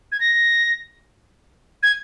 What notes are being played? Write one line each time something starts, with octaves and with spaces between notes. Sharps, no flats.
G#6
A#6
G#6